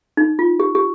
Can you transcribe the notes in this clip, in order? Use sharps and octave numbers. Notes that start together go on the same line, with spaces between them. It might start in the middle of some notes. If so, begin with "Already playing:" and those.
D#4
F4
G4
G4